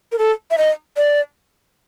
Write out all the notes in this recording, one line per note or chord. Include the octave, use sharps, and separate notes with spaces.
A#4
A4
E5
D#5
D5